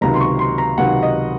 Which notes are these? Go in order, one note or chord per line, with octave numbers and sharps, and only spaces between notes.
C#2 C3 D#3 F#3 A#5
C6
C#6
C6
A#5
C#2 C3 D#3 F#3 F#5
D#5